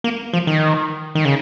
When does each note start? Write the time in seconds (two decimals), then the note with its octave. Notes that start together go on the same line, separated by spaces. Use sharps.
0.04 A#3
0.33 F3
0.47 D#3
1.15 D#3
1.25 C#3